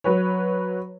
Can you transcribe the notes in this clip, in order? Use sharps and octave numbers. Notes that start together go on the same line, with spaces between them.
F#3 B4 C#5